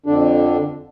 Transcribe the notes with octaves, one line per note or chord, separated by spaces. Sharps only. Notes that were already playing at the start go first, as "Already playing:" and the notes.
F2 D3 D4